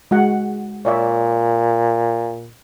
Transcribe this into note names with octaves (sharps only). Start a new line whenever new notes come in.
G#3 F#4 F#5
A#2 C#5 D5 E5